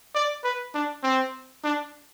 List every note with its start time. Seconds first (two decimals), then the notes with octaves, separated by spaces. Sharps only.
0.15 D5
0.44 B4
0.74 D4
1.03 C4
1.64 D4